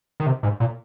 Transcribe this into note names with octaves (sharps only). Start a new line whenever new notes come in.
D#3
C3
G#2
A#2